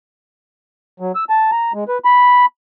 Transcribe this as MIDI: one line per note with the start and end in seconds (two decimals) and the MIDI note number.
1.00 1.12 54
1.15 1.24 88
1.29 1.51 81
1.51 1.72 82
1.74 1.84 56
1.88 1.98 71
2.05 2.46 83